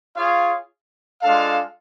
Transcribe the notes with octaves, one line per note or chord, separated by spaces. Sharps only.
F4 G#4 C#5 F5
G#3 D4 F4 A4 F5